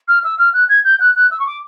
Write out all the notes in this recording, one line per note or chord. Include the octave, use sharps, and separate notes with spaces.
F6
E6
F6
F#6
G#6
G6
F#6
F#6
E6
C#6
D6